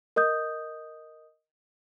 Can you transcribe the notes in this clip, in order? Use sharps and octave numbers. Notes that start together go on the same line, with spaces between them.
A#4 D#5 D#6 G6